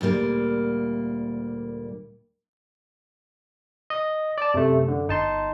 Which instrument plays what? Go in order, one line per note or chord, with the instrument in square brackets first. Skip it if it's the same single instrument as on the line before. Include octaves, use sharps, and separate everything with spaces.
[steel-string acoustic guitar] D2 A#2 G3 A#3
[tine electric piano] D#5
D5 A5
[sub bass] F#2 [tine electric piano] C3 A3
[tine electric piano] D3
[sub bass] G1 [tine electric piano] D#4 A5 C6